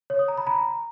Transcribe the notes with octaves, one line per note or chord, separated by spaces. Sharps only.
C#5
D#6
A#5
B5
A#5